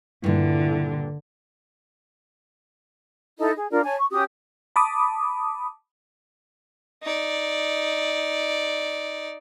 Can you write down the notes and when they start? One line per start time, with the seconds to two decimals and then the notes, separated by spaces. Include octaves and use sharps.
0.24 G2 A#2 D3 E4
3.38 D#4 E4 A4 D#5
3.56 G#4
3.71 D4 F4 A#4 D5
3.84 C#5 G#5 A5
3.98 C#6
4.10 C#4 F#4 G4 D#6
4.76 A5 B5 D6 D#6
7.03 D#4 D5